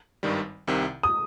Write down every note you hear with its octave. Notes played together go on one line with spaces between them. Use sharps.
G#1 G2 D#3 G3
C2 C3 D#3
D#6